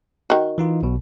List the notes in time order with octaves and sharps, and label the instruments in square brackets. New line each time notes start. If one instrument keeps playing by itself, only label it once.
[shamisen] D#3 F#4
[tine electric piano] E3 D#4 F4
B1 B2